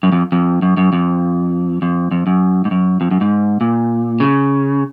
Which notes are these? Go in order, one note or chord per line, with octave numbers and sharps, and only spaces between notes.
F#2
F2
F2
F#2
F#2
F2
F2
F2
F#2
G#2
F#2
F2
F#2
G#2
A#2
C#3